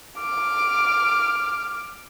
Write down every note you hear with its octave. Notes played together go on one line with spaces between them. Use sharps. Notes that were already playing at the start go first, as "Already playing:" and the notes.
D6 F6